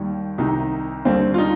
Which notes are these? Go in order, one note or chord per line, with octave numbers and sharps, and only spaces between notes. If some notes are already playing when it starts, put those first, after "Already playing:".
Already playing: D#2 D#3 G3
C2 C3 D#3 D#4
D#2 D3 G3 C4
F4
D#4